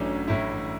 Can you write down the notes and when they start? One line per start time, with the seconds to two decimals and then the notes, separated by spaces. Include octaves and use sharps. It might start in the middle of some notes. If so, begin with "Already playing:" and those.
Already playing: A1 A2 F#3 A3 C#4 D4
0.28 A2 E4